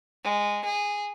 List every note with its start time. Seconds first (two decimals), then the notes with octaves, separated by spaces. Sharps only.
0.24 G#3
0.65 G#4